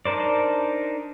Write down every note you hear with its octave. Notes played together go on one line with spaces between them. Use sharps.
D4 D#4 A#4 C5 D5